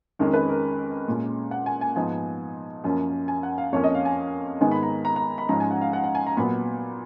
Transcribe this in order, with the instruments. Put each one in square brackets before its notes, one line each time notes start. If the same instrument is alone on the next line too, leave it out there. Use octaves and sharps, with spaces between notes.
[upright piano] F2 D#3 G#3 C#4 A#4
B4
A#4
A#2 G#3 C#4
F#5
G#5
G#5
G#2 F3 B3 G#5
F#2 F3 A#3 C#4
G#5
F#5
F5
F2 F3 A#3 C#4 C#5
D#5
F5
G#5
G#2 D#3 G#3 B3 G#5
B5
A#5
A#5
A#5
B5
G#2 F3 G#3 C#4 A#5
G#5
F#5
F5
F#5
F#5
G#5
A#5
A#2 F#3 B3 B5